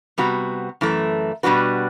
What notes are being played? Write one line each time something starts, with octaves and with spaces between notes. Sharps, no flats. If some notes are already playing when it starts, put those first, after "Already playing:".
C3 G3 B3 F#4
F#2 E3 A3
B2 G3 D4 F#4 B4